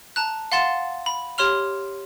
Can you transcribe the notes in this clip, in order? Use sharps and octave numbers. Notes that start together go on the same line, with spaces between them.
A5 A#5 F#6
F5 F#5 C6 A6 E7
B5
G4 C#5 C6 F6 F7